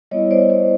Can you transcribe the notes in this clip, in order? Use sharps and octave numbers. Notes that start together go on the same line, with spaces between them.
G3 B3 E4 C#5 D#5
C5 D5
C5 D5